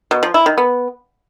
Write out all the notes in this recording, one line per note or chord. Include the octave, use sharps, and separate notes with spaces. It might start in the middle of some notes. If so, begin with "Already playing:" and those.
B2
F3
E4
D#3
B3